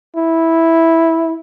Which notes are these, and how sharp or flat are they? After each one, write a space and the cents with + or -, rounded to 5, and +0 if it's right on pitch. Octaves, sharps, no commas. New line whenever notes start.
E4 -5